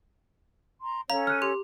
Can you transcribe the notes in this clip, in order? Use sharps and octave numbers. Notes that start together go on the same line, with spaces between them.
A#5 C6
C#4 A4 C#5 F5 A#5
F6 F#6 D#7
G4 C6